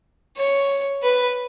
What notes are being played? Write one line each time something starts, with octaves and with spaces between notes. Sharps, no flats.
C#5
B4